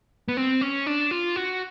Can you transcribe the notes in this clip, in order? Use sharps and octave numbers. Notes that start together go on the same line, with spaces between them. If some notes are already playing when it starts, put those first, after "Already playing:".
B3
C4
C#4
D4
F4
F#4